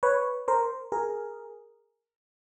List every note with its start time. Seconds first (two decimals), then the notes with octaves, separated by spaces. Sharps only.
0.03 B4 C#5
0.48 A#4 C5
0.92 G#4 A#4